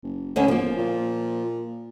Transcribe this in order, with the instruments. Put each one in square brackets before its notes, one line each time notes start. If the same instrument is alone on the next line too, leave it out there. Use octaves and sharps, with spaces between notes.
[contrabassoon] F#1
[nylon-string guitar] D2 D3 C#4
[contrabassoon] E1 [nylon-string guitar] F3 A#3
[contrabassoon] A#2